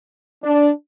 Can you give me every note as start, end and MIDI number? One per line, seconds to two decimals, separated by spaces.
0.44 0.69 62